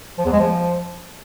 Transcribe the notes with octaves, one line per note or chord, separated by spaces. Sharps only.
F3
E2
G#3
F3